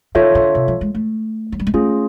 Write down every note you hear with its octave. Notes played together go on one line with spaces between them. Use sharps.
D#3 F4 A4 C#5 E5
D3
C3
F3
G#3
A3
F#3
G3
G#3
A3 C#4 F4 G#4